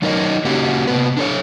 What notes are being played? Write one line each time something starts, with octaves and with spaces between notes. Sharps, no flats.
F#3 D4 D#4 A#4 C#5 D#5
C#3 A#3 C#4 F#4 G4
C3 B3 B4
D4 A4 C#5